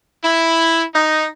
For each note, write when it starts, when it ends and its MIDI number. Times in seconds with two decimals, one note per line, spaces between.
0.24 0.83 64
0.95 1.25 63